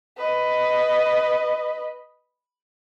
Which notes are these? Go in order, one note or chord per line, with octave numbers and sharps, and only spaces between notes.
B4 D#5